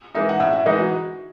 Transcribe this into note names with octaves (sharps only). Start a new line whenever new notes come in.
E3 G#3 D#4 E5
F#5
A2 E5
E5
E3 G#3 D#4 D#5
F#4